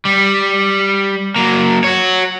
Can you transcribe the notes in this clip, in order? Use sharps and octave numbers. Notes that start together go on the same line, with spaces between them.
G3
F#3 A#3
F#4 C#5